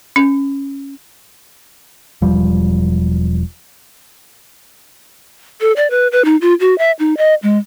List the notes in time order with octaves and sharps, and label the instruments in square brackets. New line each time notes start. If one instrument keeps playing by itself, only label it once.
[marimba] C#4
[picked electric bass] E1 F3 G3
[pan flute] A4
D5
B4
B4
D#4
F4
F#4
E5
D#4
D#5
G#3